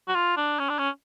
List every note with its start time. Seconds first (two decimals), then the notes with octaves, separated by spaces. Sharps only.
0.08 F#4
0.15 F4
0.37 D4
0.59 C#4
0.69 D4
0.79 C#4